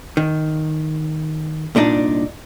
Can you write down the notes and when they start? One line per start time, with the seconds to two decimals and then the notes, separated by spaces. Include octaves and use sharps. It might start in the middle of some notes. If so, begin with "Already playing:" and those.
0.17 D#3
1.75 C2 A#2 D4 D#4 D5